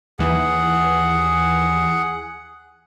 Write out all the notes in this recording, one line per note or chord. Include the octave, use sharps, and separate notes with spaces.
D#2 E3 G#4 F#5